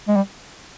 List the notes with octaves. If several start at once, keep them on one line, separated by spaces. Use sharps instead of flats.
G#3
G3